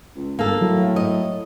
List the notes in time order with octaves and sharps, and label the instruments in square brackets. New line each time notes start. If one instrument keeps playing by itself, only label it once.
[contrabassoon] C#2
[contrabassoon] G1 [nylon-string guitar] A#3 A4
[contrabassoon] A2 [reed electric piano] F#3
[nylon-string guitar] D#5